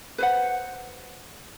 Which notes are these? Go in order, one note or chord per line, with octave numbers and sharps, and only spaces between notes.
B4 C5 F#5